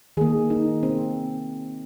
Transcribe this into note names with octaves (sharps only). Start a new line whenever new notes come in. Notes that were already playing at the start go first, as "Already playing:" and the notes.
D#3 A#3 G#4
D#4
C4